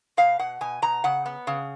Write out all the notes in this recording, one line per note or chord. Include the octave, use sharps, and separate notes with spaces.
B2 F5
B2 F#5
B2 G#5
B2 A#5
C#3 F#5
B3
C#3